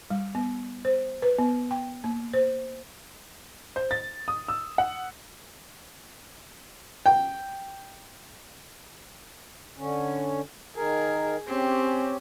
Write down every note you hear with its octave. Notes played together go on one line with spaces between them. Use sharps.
G3
B3
C5
B4
B3
G5
A#3
C5
C5
A6
D#6
E6
F#5
G5
D3 C#4
D#3 G#4 A#4
C4 C#4 G4